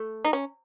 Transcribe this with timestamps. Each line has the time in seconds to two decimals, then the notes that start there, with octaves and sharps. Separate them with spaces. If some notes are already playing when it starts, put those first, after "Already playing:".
Already playing: A3
0.25 D#4
0.33 C#4